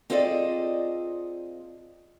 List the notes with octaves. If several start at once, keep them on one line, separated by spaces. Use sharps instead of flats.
C4 F4 G#4 A4 D5 D#5